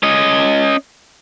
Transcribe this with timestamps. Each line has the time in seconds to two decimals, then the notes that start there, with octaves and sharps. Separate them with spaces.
0.03 C#4 D#5